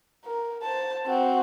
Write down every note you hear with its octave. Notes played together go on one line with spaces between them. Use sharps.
A#4
C5 A5
C4 F#4